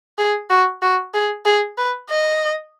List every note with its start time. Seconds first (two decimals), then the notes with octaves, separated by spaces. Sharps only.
0.18 G#4
0.50 F#4
0.82 F#4
1.14 G#4
1.45 G#4
1.78 B4
2.10 D#5